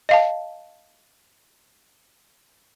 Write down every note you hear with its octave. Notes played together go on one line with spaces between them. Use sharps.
D#5 F5 A5